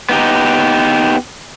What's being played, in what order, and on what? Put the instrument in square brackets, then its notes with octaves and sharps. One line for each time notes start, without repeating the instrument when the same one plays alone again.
[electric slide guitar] B3 D#4 G4